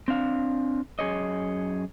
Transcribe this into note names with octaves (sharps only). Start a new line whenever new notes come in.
C4 D4 F5
F#2 G#4 C#5 D#5